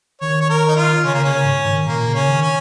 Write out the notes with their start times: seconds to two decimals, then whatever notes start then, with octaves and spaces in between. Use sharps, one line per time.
0.21 D#3 C#5
0.41 C#5
0.50 A#4
0.68 D#4
0.76 F4
1.04 C#3 C#4
1.14 A#3
1.24 C#3 C#4
1.45 G#2
1.65 D#3
1.86 A#2 A#3
2.07 C#3
2.14 C#4
2.28 D#3
2.42 C#4